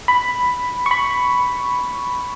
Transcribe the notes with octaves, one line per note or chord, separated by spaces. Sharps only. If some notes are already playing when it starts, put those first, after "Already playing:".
B5
C#6
B5